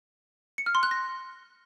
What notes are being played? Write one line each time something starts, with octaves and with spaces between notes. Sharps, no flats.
C#7
F6
C6
F#6
A#6